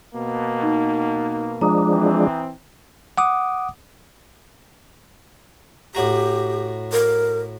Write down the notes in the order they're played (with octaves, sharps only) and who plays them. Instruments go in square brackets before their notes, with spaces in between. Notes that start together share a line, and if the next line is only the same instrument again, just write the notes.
[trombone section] B2 A#3
[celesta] D#4
[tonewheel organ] F3 G#3 D4 [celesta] A#5 D#6
[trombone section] E3 C4
[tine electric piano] F#5 D6 D#6
[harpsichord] A2 F#4 A#5 [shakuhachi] G4
[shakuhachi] A#4